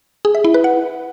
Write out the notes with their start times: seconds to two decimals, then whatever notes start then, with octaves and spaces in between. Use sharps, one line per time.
0.25 G#4
0.35 E5
0.44 E4
0.54 B4
0.64 F#5